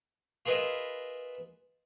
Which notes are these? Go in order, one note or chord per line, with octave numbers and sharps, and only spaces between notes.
F4 G#4 A#4 B4 D#5 E5